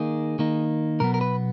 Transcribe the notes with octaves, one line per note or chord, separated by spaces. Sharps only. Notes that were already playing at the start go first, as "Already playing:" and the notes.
Already playing: D#3 A#3 D#4 G#4
D#3 A#3 D#4
B2 F#3 B3 A#4
A#4
B4